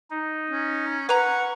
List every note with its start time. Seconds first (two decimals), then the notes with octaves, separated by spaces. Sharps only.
0.10 D#4
0.50 C#4
1.09 B4 F#5 A#5 C#6